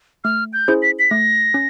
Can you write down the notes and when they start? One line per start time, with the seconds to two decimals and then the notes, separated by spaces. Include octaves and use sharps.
0.24 A3 F6
0.53 G6
0.68 C#4 E4 G#4 C5
0.82 B6
0.99 B6
1.11 A3 A#6
1.54 C#4